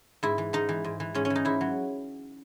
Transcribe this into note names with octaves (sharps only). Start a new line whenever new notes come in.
G#2 E4
E3
G#2 D#4
E3
G#2
E3
G#2 C#4
C#4
E3
D#4
G#2 E4
F#3